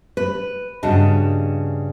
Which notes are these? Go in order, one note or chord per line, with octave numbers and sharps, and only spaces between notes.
B4
G2 C#3 F#4 D#5 A5